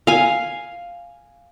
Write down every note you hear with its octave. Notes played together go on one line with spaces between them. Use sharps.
F5 G#5